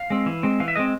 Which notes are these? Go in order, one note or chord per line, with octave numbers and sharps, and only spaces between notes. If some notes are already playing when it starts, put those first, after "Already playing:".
Already playing: F5
G#3 C4
E3
G#3 C4
E3 F5
E5
G#3 C4 D#5